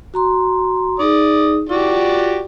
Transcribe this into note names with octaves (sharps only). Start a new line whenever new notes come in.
F#4 A#5 C6
D#4 G#4 D5 D#6
E4 F#4 G4 D5
F4